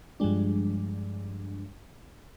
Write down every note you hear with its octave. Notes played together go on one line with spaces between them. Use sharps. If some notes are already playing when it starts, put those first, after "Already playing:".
G2 F3 G3 G#3 D4